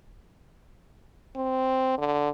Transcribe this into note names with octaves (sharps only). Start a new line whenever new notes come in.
C4
D3